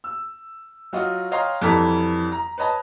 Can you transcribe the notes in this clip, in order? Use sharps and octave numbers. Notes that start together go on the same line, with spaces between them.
E6
F#3 F4 F#4 D#5
C#5 D#5 F5 G5 A#5 C6
F2 E3 G3 A4 A#5 B6
A#5
B4 C#5 D#5 A5